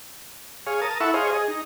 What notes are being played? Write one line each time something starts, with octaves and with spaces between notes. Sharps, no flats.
G#4 C#5 F5
A#4 A5 D#6
E4 A4 E5 F#5 B5 C#6
G#4 C5 C#5 D#5 F5
G#4 D#5
D#4